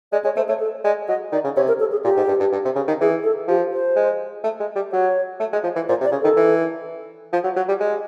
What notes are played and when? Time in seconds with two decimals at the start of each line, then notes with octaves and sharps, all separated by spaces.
0.12 G#3 D5
0.24 G#3 C#5
0.36 A3 C5
0.49 A3 C#5
0.60 A4
0.84 G#3 D5
1.08 F#3 D#5
1.32 D#3 D5
1.44 C#3
1.56 C3 C#5
1.68 A#4
1.80 A4
1.92 G#4
2.04 A#2 G4
2.16 G#2
2.28 G2
2.40 G2
2.52 G2
2.65 C3
2.76 C#3
2.88 D#3
3.01 E3 G#4
3.24 A4
3.48 F3 G4
3.72 C5
3.96 G#3
4.44 A3
4.60 G#3
4.76 G3
4.92 F#3 C#5
5.40 A3
5.53 G#3
5.64 F3
5.76 E3
5.89 A#2 C5
6.01 C3
6.05 D5
6.12 C#3
6.21 D#3 A4
6.36 E3
7.33 F3
7.44 F#3
7.57 F#3
7.68 G3
7.80 G#3